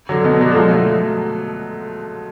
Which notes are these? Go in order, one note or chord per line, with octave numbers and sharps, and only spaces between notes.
D3 F#3
B2 D3
D3 F#3
F#3
F3 G#3
F#3 A3